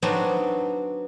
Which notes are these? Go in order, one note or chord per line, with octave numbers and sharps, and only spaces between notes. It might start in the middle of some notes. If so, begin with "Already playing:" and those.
F#3 B3 C4 D4 D#4 F#4